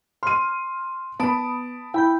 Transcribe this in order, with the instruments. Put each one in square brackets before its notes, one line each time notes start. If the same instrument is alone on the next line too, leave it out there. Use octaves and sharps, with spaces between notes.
[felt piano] C6 D#7 [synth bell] F6
[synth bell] B3 D#6 D7 [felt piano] A5 B5
[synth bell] E4 B5 G6 [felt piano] G5